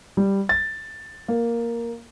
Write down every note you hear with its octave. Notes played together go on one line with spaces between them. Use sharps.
G3
A6
A#3